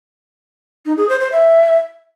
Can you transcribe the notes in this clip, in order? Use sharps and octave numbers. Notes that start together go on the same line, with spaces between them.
D#4
G#4
C5
C5
E5